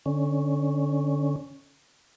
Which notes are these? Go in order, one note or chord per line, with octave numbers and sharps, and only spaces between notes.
D3 C#4